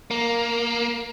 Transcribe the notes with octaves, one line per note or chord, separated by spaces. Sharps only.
A#3